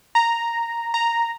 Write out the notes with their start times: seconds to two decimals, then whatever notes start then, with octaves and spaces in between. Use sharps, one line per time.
0.15 A#5
0.94 A#5